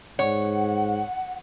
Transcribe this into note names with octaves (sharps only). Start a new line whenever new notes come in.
G#2 C#5 F#5